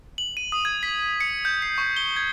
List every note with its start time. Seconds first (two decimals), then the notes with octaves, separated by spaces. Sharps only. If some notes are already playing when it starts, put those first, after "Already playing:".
0.18 F#7
0.37 D#7
0.52 D#6
0.65 G#6
0.83 B6
1.21 C#7
1.45 G6
1.62 C7
1.78 C#6
1.97 G7
2.16 G#6